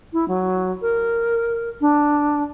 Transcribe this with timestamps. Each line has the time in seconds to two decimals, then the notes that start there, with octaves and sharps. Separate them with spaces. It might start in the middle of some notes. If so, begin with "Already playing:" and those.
0.13 E4
0.28 F#3
0.82 A#4
1.81 D4